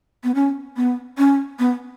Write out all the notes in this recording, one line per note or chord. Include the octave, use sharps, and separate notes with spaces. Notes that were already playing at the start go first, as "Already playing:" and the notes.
B3
C#4
B3
C#4
B3